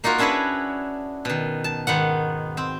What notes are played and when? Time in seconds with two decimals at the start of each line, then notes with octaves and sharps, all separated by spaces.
0.04 A#3 D#4 F4 F#4 A#4
0.18 C#4 D4 E4 G#4 B4 C#5
1.25 B2 D#3
1.64 A5
1.87 G#2 D#3 B3 F#5
2.57 C4